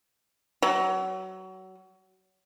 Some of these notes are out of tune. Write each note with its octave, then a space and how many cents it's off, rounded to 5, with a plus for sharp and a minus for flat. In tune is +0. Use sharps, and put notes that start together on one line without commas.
F#3 +25